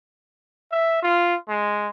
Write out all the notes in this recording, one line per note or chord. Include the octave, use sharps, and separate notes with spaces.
E5
F4
G#3